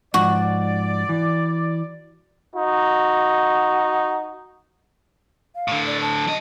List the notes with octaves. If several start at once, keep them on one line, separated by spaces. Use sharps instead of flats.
G#2 F3 F#4 D5
E3
D#4 F#4
F5
A2 D3
D5
A5
F#3 D#5